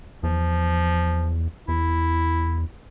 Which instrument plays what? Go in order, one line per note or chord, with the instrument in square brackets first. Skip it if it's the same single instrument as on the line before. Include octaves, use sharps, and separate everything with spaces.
[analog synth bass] E2 [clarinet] F3
[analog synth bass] E2 [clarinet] E4